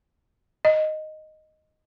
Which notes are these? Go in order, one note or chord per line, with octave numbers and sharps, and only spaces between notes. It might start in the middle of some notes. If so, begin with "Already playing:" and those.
D#5